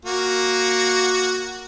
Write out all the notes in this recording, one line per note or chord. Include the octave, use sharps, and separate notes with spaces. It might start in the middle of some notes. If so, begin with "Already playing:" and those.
A#3 F#4